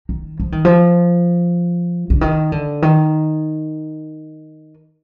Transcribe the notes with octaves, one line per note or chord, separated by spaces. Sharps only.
D#3
F3
D#3
F3
D3
D#3
D3
D#3